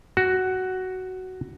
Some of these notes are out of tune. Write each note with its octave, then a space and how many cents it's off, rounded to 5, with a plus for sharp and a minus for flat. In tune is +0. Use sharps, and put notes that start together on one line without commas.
F#4 +10